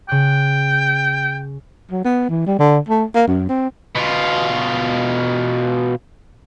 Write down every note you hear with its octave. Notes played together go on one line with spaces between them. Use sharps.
C#3 G5 F#6
F#3
B3
E3
G3
D3
A3
A#3
F#2
C4
B2 F4